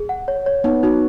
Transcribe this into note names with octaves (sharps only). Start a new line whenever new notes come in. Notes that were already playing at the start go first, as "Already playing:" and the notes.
Already playing: G#4
F#5
C#5
C#5
B3 D#4
D#4 F#4